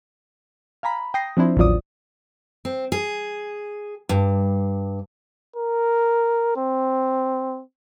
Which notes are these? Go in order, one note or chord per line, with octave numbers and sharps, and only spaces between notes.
F5 G#5 A#5 B5
G5 D#6 A#6 C7
F3 C4 D4 E4 C5
A1 D#2 F#3 F4 D5 D#6
C4
G#4
G2
A#4
C4